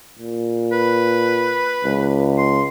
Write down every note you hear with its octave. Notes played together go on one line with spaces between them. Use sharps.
A#2
B4
C#2
C6